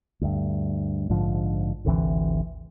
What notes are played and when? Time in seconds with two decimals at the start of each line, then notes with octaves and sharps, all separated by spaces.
0.21 D2 G2
1.09 A#1 G#2 D3 F3
1.85 G#1 D2 C3 E3